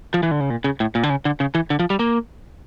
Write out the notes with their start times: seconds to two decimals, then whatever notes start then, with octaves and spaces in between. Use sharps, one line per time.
0.14 F3
0.23 E3
0.31 D3
0.40 C#3
0.50 A#2
0.64 C#3
0.80 A2
0.95 A#2
1.03 D3
1.10 C#3
1.25 D3
1.40 C#3
1.55 E3
1.70 D3
1.79 F3
1.90 G3
1.99 A#3